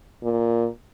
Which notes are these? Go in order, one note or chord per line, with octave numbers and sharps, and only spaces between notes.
A#2